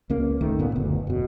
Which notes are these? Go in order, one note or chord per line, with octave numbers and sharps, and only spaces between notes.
C#2 A#3 C#4
G1 C#2 D#3 A3
D2 A#2 B3
F#1 D2
E1 B2